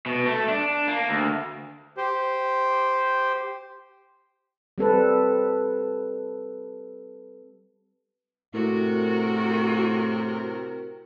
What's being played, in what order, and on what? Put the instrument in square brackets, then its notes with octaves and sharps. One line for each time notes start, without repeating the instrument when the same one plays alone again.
[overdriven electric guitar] B2
A3
D4
A#3
D2
[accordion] G4 C5
[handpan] G3 C4 A4 B4
[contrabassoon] A2 [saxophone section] C3 A#4 [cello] F#4